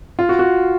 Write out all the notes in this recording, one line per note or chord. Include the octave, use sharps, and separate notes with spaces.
F4
F#4
F#4